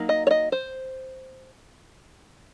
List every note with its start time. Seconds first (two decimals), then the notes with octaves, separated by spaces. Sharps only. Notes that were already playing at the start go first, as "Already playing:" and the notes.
Already playing: F#3 A#3 D#4
0.09 D#5
0.27 C#5
0.31 D#5
0.52 C5